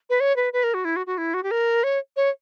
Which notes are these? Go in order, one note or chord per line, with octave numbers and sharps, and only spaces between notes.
B4
C#5
B4
B4
A#4
F#4
E4
F#4
F#4
E4
F#4
G4
A#4
C#5
C#5